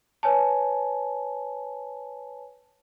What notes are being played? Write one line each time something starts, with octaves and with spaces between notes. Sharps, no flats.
B4 C#5 G#5 A5